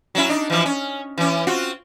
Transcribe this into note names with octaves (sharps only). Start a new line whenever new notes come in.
F#3 C#4 E4
D4 D#4
E3 F3
C#4
E3 C#4
C4 F4 F#4